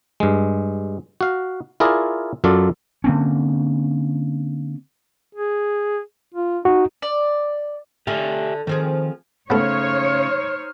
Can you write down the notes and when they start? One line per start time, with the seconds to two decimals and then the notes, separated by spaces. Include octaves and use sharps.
0.20 G2 G#3
1.21 F#4 F5
1.80 E4 F4 G#4 A#4 D5
2.44 F#2 F#3 F4 A4 D5
3.04 D3 A#3 C4 C#4
5.35 G#4
6.34 F4
6.65 D#4 F#4
7.02 D5
8.07 D3 F4 G4 E5 G#5
8.67 D#3 F3 C4 G#4
9.50 C#3 A3 B3 D#4 A4 C5 C#5 F6